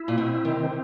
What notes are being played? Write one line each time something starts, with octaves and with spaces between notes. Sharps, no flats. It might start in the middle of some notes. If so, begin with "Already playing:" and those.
Already playing: E4
A#2
B2 C4
C3 D#3